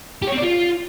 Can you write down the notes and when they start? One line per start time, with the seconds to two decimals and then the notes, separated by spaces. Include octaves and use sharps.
0.22 G4
0.28 C#5
0.33 C4
0.38 D5
0.43 F4